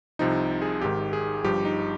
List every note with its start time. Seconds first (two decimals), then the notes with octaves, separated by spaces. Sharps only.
0.19 C2 C3 F3 D#4
0.62 G#4
0.81 G#1 G#2 D#3 G4
1.13 G#4
1.44 G1 G2 F3 G4
1.65 D#4